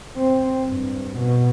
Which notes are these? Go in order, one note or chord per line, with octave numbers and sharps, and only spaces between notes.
C4
G2
B2